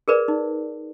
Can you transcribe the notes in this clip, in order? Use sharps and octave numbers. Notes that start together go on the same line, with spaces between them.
G#4 A#4 B4 D5
D#4